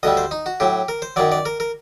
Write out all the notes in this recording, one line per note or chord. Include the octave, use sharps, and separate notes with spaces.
D2 D3 G3 D#5
C5
D#4
F#4
A2 F#3 G4
A#4
C5
F#2 D#3 F#3 D5
D5
A#4
A#4